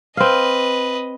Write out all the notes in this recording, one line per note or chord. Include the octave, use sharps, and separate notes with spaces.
C4 B4 D#5 F5